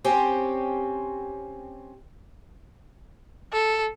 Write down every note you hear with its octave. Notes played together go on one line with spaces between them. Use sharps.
C4 C#4 G4
A4